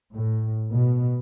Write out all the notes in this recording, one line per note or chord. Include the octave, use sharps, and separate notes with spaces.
A2
B2